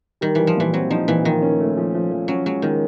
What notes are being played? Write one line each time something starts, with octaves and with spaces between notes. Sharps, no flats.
D#3 G3
E3 G3
F3
A#2 E3
F#3 C4
F3 D#4
A#2 E3
D#3 F3
C#4
A3
F3
F3
F3
F#3 C#4
F#3 G#3
D#3 G#3